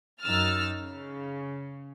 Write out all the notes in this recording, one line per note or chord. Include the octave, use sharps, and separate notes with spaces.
F#2 D#4 E6 F6 A6
C#3